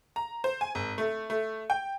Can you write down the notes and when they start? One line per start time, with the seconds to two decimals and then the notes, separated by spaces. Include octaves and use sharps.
0.16 A#5
0.44 C5
0.61 G#5
0.75 G#1
0.98 A3
1.30 A3
1.70 G5